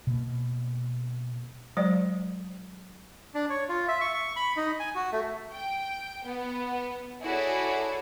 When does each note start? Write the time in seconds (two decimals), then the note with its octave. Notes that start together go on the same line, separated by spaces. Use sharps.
0.07 B2 A#3
1.77 F#3 G#3 C5 D5
3.35 D4
3.50 C#5
3.69 F4
3.88 E5
4.01 C#6
4.14 C#6
4.36 B5
4.57 D#4
4.80 G#5
4.95 F#4
5.12 A3
5.52 G5
6.25 B3
7.22 E4 F#4 G#4 A4 C#5 D5